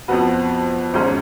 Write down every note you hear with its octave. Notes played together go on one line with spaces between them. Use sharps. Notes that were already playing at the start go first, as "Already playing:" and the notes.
F2 F3 B3 F#4 B4
G#1 G#2 G#3 C#4